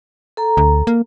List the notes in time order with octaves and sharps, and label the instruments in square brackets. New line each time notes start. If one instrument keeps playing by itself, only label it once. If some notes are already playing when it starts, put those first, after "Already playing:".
[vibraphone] A4 A#5
[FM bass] D2
A#3